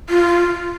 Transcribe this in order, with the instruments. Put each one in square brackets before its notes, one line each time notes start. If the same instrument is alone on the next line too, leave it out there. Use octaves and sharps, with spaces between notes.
[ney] F4